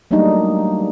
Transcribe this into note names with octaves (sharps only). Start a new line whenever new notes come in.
F#3 G3 A3 A#3 D4 D#4